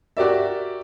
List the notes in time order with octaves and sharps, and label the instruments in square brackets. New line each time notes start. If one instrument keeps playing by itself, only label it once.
[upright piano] F#4 G4 A#4 D5 E5